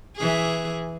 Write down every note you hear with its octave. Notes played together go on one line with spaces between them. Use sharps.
E3 G#4